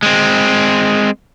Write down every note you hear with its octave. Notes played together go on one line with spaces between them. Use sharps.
G#3 C4